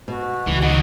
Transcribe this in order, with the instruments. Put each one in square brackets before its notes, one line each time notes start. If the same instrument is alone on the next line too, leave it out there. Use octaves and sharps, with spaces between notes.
[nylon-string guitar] B2 [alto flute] F#4
[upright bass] C#2 [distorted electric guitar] E3
[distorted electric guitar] D#3 F#3 [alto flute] D#5 [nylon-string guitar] F#5